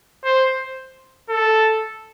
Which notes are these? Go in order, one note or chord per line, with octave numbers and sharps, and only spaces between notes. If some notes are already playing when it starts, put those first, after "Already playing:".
C5
A4